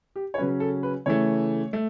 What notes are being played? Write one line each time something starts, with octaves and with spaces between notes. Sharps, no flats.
G4
C#5
C#3 F#3 C#4 B4
A4
B4
C#3 E3 A3 C#5
A3